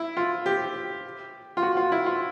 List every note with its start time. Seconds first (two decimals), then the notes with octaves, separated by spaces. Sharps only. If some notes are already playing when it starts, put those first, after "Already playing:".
Already playing: E4
0.17 F4
0.46 G4
1.57 F4
1.63 F#4
1.77 F4
1.92 E4
2.06 F4